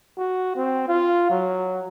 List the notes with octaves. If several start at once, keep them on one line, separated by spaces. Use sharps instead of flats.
F#4
C4
F4
F#3